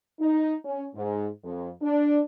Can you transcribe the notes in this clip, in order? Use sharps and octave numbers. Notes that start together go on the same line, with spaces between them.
D#4
C#4
G#2
F2
D4